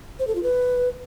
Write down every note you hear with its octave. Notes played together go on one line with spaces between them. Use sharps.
C5
A4
F4
B4